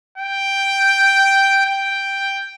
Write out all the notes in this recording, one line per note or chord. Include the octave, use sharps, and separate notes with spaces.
G5
G5